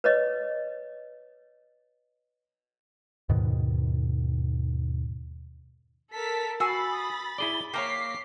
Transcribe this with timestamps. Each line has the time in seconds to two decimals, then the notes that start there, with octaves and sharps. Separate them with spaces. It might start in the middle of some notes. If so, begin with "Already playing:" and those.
0.04 B4 C#5 D#5
3.29 D#2 G#2 B2 D#3
6.13 A4 A#4 A5 B6
6.60 F#4 G#5 B5 E6 A6 C7
6.91 D#6
7.38 E4 G#4 D5 G7
7.74 A#3 C#5 F5 G5 A#5 D6 B6 C7